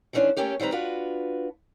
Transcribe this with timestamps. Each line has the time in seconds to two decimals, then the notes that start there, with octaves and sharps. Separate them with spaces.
0.13 D#3 E3 G3 C#4 D4 C5
0.37 A3 A#3 C#4 G4 C#5
0.60 D#3 G3 C4 B4 A#5
0.72 D4 F4 F#4 B4